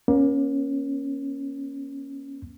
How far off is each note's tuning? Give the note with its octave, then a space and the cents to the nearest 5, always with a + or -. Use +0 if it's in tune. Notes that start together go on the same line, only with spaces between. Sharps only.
A#3 +30 C#4 -5